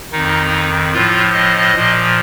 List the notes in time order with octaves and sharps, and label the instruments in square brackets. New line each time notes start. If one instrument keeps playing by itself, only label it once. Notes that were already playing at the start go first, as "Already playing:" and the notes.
[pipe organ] F2 D#3 D#4
A2 F3 F4
D#5
A#2 F3